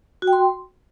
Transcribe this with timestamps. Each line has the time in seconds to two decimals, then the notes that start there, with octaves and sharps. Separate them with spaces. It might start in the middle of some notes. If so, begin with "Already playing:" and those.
0.22 F#4
0.27 G5
0.33 C6